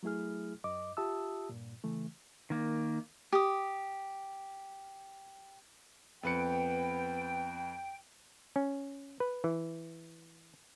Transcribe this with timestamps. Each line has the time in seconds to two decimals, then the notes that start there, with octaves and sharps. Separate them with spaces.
0.03 F#3 A3 E4 G#4 F6
0.64 F#2 D#5 D6
0.97 F4 G4 E5 A5 D#6 E6
1.49 G2 A#2
1.84 C#3 E3 A3
2.50 D#3 A#3
3.32 G4 D#6
6.23 F2 B3 B4 G5 C#7
8.56 C#4
9.20 B4
9.44 E3